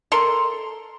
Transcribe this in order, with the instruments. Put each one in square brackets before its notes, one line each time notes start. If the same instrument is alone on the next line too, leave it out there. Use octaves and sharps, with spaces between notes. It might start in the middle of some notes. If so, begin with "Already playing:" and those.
[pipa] A4 A#4 C6